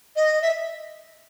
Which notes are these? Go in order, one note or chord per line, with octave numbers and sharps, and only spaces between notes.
D#5
E5